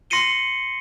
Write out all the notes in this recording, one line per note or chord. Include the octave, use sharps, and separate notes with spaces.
C6 A#6 C7 C#7 D#7 G7